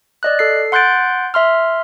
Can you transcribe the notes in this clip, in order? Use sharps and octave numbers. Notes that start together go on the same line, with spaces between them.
D5 D#5 F#6
A4 C7
F#5 C6 F#6 G6 A6 D7
E5 C6 F6